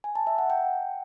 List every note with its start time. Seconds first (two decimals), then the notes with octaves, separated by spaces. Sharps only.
0.04 G#5
0.15 A5
0.27 E5
0.38 F#5
0.50 G5